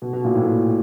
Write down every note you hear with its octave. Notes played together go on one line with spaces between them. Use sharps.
B2
B2
A#2
A2